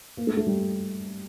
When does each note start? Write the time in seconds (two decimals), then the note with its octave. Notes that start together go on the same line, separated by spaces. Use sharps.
0.17 A#3
0.27 A3
0.37 A3
0.47 G3